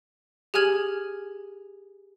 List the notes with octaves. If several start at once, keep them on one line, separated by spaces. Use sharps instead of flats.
G4 G#4 G#5 F6 G#6 F#7